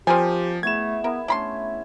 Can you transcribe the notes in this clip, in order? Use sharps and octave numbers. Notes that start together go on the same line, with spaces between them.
F3 C4 G4 A#4 D5 G#5 A5
A3 B3 E4 G#4 G#6 E7
B3 E4 A#4
A3 C#4 D4 E4 B5 C6